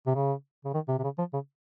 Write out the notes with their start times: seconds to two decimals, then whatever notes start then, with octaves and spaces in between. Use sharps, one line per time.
0.07 C3
0.15 C#3
0.65 C#3
0.74 D#3
0.88 C3
0.99 C3
1.04 C#3
1.18 F3
1.33 C#3